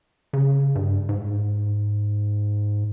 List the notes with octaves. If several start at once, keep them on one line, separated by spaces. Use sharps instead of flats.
C#3
G2
G#2